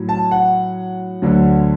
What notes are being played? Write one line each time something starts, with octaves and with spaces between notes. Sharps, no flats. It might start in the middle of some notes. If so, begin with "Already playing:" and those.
Already playing: A2 F#3
A5
F#5
D2 D3 F#3